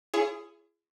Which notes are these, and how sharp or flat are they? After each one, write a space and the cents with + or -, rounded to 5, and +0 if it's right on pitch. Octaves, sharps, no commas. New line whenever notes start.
E4 +45 G#4 +5 C#5 +0